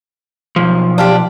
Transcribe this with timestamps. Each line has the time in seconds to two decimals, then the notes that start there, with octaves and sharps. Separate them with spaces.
0.56 B1 F3
0.98 D4 F4 G4